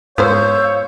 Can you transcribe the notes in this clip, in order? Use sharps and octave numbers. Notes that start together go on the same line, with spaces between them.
G#2 B3 F4 C5 C#5 F5 E6 G6